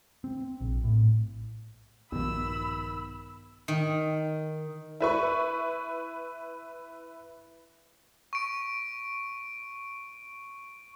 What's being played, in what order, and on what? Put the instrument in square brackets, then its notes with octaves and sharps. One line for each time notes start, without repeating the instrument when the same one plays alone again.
[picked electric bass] C4
A#1
A2
[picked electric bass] A#1 G2 F3 [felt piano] B2 D#3 [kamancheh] B5 E6
[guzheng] D#3
[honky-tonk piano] E4 B4 C#6
[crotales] C#6 D7